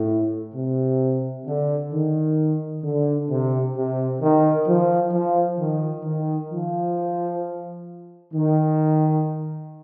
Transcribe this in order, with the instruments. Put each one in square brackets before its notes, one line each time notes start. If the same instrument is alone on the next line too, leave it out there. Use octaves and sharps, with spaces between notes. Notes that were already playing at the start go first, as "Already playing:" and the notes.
Already playing: [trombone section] A2
C3
D3
D#3
D3
C3
C3
D#3
F3
F3
D#3
D#3
F3
D#3